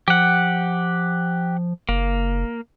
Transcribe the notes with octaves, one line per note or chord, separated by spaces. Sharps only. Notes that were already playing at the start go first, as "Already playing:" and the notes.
F3 G4 F#5
F#1 A#3